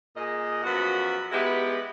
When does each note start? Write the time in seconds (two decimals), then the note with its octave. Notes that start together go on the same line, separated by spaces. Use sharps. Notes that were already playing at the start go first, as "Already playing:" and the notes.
0.16 A#2 G#4 D#5
0.64 F#2 F3 B3 F#4 B5
1.32 G#3 B3 E4 G4 B4